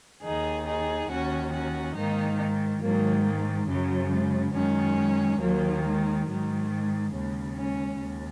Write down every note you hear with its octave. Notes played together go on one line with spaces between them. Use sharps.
D#2 D#3 D#4 G#4
D#4 G#4
D#2 D#3 C#4 F#4
C#4 F#4
G#2 D#3 A#3 D#4
G#2 D#3 F#3 A#3
G#3
F#2 C#3 F#3
G#3
F#2 D#3 G#3 C#4
D#2 D#3 F#3 A#3
G#3
G#2 D#3 F#3
G#3
D#2 C#3 G#3
G#3 C#4
D#2